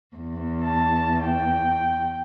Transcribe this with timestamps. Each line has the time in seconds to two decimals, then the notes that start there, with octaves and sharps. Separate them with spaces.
0.16 E2
0.65 A5
1.25 G5